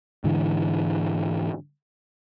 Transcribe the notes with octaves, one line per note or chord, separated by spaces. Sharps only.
G#2 D3 E3